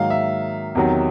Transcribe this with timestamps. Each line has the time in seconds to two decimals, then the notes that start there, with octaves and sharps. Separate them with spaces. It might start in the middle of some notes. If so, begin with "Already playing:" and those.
Already playing: G#2 D#3 F#3 A#3 F5
0.10 E5
0.75 E2 C3 D#3 F#3